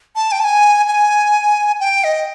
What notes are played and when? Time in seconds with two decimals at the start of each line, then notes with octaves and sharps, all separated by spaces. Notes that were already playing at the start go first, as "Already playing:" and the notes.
0.16 A5
0.32 G5
0.40 A5
0.44 G#5
0.87 G#5
1.80 G5
2.04 D#5